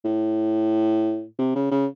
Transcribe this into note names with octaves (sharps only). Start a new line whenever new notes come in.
A2
C3
C#3
C#3